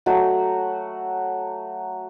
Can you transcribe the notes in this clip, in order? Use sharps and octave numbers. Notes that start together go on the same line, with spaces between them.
F#3 A3 F#4